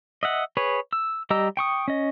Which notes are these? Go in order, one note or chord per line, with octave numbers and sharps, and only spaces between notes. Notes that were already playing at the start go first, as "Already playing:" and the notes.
D#5 E5 F#5
G#4 B4 C#5
E6
G3 G4 D#5 A#5 E6
G5 C#6 D#6
C#4 D#5